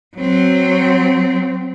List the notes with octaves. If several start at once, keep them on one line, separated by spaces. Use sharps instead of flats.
F#3 C4